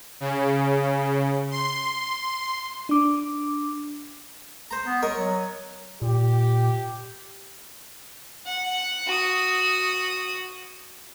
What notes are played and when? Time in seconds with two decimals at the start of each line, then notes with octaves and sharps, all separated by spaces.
0.20 C#3
1.51 C6
2.89 D4 D6
4.71 C5 A#5
4.86 B3
5.03 A#4 C#5 D#5
5.17 F#3
6.02 A#2 G4
8.46 F#5
9.07 F#4 D#6